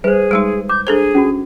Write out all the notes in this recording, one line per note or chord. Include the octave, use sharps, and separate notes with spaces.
G3 G#4 B4 C5
G3 G#3 D#4
D6 G6
D4 G#4 A4 C5
C#4 F#4